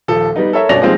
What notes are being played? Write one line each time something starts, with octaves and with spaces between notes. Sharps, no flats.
D#1 F3 A4
G3 B3 D#4
A4 A#4 C#5 E5
G2 B2 C#4 D5 A#6 F7
F3 G3 G#3 A#3 C4 D#4